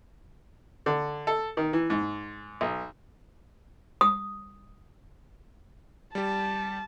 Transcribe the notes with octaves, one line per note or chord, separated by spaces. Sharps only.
D3
A4
D#3
E3
G#2
B1
D#6
G3 G4 A5